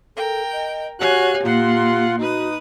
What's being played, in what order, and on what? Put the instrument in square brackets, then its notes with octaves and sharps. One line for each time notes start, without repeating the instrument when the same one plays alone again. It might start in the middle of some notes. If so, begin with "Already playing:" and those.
[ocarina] A4 [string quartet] A#4 G5
[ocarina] D#5
[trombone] F#4 [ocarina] G4 [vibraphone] C#5 [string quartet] F5 G#5 F#6
[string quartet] A#2 F#5 C6 [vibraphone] A#3 [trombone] F4
[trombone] D#4 [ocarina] F#4 [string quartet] B4 D#6